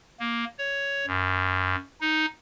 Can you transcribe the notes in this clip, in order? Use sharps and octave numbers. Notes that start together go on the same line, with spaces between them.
A#3
C#5
F#2
D#4